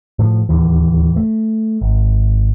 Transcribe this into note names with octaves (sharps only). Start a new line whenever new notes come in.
A2 F3
D1 D#2 E3
A3
G#1